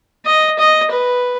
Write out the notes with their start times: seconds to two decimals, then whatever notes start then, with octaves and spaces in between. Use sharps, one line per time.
0.26 D#5
0.59 D#5
0.91 B4